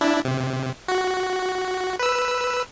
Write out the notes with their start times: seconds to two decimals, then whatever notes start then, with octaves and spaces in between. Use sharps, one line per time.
0.01 D4 E4
0.25 C3
0.88 F#4
1.99 B4 E6